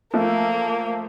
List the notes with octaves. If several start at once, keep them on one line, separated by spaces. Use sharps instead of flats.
F3 A3 A#3